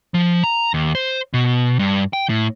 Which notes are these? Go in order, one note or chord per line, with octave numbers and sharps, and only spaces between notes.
F3
A#5
D#2
C5
B2
G2
G5
A2